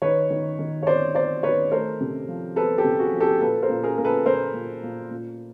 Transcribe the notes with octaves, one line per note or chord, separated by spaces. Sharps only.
D#3 B4 C#5
D#3
D#3
C#5
C4 C5 D5
C4 C5 D5
D#3 B4 C#5
A3 A#4 C5
C3
F3
C4 A4 B4
G4 A4
C3
F#4 G#4
F3
G4 A4
A#2 A4 B4
A#4 C5
A#2
G#4 A#4
A#2 A#4
A4 B4
A#2 A#4 C5
A#2
A#2
A#2